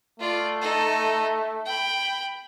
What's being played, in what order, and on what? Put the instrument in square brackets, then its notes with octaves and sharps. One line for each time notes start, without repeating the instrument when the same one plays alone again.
[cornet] A3 [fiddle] F4 D5
[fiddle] D#4 A4
G5 B5